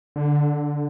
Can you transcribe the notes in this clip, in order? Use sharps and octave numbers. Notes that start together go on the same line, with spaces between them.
D3